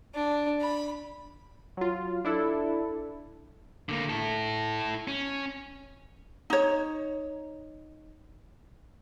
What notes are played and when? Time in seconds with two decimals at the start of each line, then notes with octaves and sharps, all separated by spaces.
0.14 D4
0.61 B5
1.77 F#3 F4
2.25 D4 E4 A4
3.89 D3 A#3
4.10 E4 A4
5.08 C#4
6.50 D#4 C#5